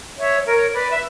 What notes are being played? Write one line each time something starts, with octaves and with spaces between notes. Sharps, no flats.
C#5 E5
A#4 C#5
B4 D5
E5